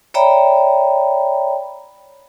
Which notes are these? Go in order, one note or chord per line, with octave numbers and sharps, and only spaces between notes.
C#5 D5 E5 G5 A#5 B5